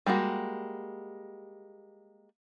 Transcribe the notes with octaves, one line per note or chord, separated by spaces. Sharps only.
G3 G#3 A#3 F#4